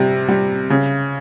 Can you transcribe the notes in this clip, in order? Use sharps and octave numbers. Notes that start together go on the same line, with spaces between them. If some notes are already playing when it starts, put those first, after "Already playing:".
Already playing: C3 G3
G3
C#3